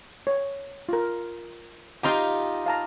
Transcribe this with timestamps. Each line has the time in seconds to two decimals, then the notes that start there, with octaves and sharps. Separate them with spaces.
0.27 C#5
0.89 F4 A#4
2.03 D#4 F4 G4 G5 A#5 C6
2.66 F5 A5 A#5